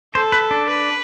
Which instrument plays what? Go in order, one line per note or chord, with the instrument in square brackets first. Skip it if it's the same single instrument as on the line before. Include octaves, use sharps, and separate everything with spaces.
[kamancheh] A4 [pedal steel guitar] C5
[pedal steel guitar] B4
D4
[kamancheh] B4